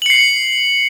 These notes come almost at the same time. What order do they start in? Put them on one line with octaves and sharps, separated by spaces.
F#7 C#7 C7